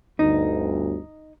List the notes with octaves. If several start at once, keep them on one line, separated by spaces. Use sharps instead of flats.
G1 D2 D#4